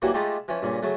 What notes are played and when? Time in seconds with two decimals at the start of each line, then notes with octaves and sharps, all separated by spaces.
0.02 E3 F#3 G3 A#3 F#4
0.14 G#3 A3 D#4 F4 G4 A4
0.48 E3 F3 C#4
0.62 G2 A#2 C#3
0.82 C#3 F#3 A3